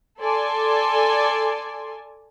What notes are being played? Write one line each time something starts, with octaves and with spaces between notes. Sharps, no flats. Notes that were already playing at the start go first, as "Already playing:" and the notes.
A4 D5 G#5 C6